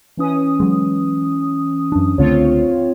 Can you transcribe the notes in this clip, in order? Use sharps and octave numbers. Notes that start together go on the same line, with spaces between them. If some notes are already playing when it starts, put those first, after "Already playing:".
E3 C#4 D#6
F#3 G#3
F#2 D4
C#2 D3 A3 C4 F4 C#5